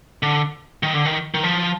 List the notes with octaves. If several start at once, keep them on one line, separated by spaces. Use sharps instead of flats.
D3
D#3
D3
D#3
D#3
F3